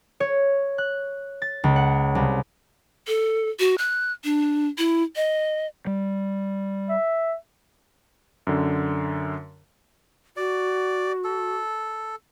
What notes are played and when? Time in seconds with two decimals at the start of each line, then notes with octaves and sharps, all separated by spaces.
0.20 C#5
0.78 F#6
1.42 A6
1.64 C#2
1.76 F#5
2.15 C2
3.08 A4
3.60 F#4
3.78 F#6
4.24 D4
4.78 E4
5.16 D#5
5.87 G3
6.89 E5
8.47 F#2 D3
10.37 F#4 D5
11.24 A4